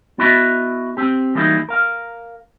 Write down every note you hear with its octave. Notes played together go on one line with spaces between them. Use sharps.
B3 E4 F#4 D#5 E5 B5
C4 G4
E3 F#3 G3 A#3 D#4 E4
A#4 F5